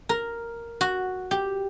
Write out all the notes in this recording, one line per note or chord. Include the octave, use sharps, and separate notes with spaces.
A#4
F#4
G4